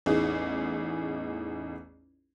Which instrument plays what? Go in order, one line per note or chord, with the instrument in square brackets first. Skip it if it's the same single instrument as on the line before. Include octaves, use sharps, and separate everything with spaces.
[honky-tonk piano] A1 E2 D#4 G#4